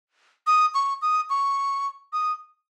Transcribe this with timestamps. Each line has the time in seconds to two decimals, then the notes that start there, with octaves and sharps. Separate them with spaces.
0.47 D#6
0.74 C#6
1.02 D#6
1.30 C#6
2.13 D#6